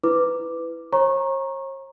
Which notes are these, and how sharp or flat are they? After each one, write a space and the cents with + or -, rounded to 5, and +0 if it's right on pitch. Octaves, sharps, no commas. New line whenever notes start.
E4 +0 B4 +15 D6 +0
C#5 -45 A#5 +10 C#6 -25